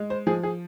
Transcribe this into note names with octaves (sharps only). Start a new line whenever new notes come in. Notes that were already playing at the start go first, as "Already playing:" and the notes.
Already playing: G#3
C5
F3 G#4
G#4